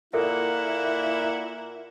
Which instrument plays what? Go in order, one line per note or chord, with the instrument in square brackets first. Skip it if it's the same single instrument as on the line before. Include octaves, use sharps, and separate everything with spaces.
[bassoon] A#2 [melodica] A#3 F#5 [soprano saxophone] E4 [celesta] A4 A#4 E5